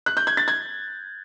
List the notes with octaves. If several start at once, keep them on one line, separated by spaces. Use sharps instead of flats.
F#6
G6
G#6
A6
G#6